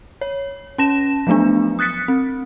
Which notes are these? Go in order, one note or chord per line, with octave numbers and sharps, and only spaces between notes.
C#5
C#4 A5 A#6 E7
F3 F#3 A3 B3 D4
D#6 F#6 A6 B6 C#7
C4